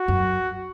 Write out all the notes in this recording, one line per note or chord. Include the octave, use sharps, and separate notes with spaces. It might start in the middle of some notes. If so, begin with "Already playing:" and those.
Already playing: F#4
F#2